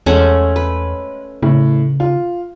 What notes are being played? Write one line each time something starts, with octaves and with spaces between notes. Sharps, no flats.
E2 G#3 A3 C#4 F#5
B4
A2 C#3
F4